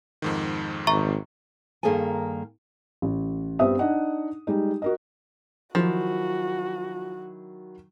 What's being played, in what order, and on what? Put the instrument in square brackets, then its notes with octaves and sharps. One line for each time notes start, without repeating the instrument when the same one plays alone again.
[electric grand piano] F2 G#2 D#3
[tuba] G#1 [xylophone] E5 A#5 C#6
[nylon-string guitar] G2 D#3 A#3 G#4 A4 G#5
[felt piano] A1
G2 B3 C4 E5 D#6
D4 D#4 D#5 F#5
G3 G#3 D#4
F#4 A#4 D#5
[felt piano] D#3 F#3 E4 [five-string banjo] F3 [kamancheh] F#4